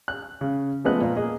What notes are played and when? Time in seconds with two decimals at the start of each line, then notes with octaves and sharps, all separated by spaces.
0.08 F#6
0.41 C#3
0.84 F3 G#3 A3 B3 D#5 F#6
1.01 A#2
1.16 A#3 G#4 D#5